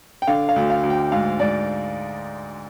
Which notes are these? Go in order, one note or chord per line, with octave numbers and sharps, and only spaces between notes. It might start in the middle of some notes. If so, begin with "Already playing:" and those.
G5
D3 F5
F5
D2
F5
D2
G5
G#2 F5
G#2 D5